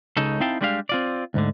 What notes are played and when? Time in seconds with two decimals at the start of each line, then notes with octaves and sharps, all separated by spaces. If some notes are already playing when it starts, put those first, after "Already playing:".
0.17 C#2 C#3 D#4 A4
0.40 C4 D#4 E4 F5 G5 A5
0.61 G3 G#3 D4 G4 B4 F5
0.89 C4 F4 D5
1.34 D2 G#2 D3